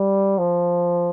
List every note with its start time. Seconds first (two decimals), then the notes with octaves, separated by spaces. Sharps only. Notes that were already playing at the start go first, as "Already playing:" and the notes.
Already playing: G3
0.38 F3